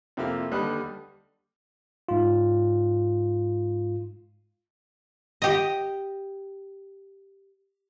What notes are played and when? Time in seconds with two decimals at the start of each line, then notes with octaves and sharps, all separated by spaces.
0.17 F2 C3 A#3 E4 F4 F6
0.51 D#2 D3 G3 B4 D#5 F#6
2.09 G#2 F4
5.42 G4 D#5